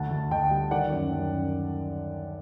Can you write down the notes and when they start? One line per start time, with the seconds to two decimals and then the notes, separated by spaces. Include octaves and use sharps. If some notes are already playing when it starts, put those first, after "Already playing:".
Already playing: D2 F#5 A5
0.11 D2
0.31 D2 D#5 G5
0.51 G3
0.71 D#3 D5 F#5
0.91 F#2
1.12 F#2